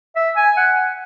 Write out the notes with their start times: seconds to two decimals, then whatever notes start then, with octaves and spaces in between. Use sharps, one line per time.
0.16 E5
0.36 G#5
0.57 F#5